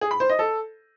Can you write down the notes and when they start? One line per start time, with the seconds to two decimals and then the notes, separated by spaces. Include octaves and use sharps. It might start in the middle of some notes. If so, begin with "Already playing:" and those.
0.01 G#4
0.11 B5
0.20 C5
0.30 D#5
0.39 A4